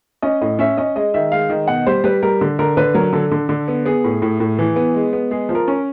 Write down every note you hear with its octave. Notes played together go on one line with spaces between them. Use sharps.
C#4 D#5
A2 D#5
C#4 E5
C#4 D#5
G#3 D#5
D#3 E5
G#3 F5
D#3
B2 F#5
G3 C5
G3 B4
G3 A#4
D3
D3 A#4
D3 B4
F#3 A#4
D3 A4
D3
D3
B3
B3 G#4
A2
A2
A2
E3
B3
G#3
B3
G#3 G#4
F3
A#4
C#4